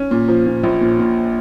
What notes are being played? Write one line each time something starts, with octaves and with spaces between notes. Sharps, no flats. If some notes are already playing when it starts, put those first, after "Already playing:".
Already playing: C#4
A#2
F3
A#2
A#1
A#2
A#2